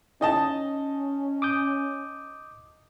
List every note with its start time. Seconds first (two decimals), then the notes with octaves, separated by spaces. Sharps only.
0.21 C#4 D#4 D#5 A5
1.42 D6 D#6 G6